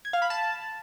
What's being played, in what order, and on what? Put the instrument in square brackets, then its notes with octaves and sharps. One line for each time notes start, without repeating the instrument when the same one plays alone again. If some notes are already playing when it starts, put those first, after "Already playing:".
[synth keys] G#6
F5
B5
A5